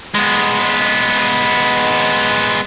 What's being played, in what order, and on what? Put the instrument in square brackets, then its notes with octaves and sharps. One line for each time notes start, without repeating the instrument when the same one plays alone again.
[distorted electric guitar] G#3 B3